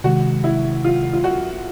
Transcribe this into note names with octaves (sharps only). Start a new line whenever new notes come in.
C3 D#3 G#3 F#4
E4
F4
F4
F#4